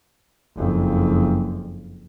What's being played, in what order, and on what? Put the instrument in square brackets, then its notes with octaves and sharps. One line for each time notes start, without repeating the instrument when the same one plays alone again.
[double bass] F#1 F2